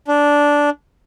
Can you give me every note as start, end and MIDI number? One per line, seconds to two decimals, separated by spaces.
0.08 0.70 62